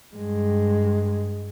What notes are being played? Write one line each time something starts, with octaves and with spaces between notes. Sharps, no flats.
G2 G#3